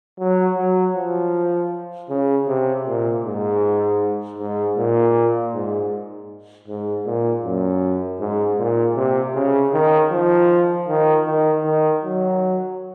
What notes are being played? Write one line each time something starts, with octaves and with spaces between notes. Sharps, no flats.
F#3
F#3
F3
C#3
C3
A#2
G#2
G#2
A#2
G#2
G#2
A#2
F#2
G#2
A#2
C3
C#3
D#3
F3
D#3
D#3
D#3
F#3